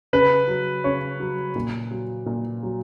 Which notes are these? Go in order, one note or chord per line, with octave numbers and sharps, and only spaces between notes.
C#3 B4
F#3
C#3 C#5
F#3
A#2
F#3
A#2
F#3